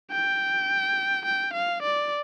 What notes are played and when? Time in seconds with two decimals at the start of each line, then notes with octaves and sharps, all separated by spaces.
0.11 G5
1.25 G5
1.54 F5
1.82 D5